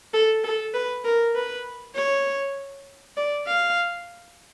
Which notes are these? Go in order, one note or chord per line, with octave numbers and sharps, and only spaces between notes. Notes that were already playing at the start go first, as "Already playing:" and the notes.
A4
A4
B4
A#4
B4
C#5
D5
F5